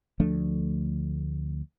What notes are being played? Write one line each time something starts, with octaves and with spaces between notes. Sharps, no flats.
D2 F3 A3 D4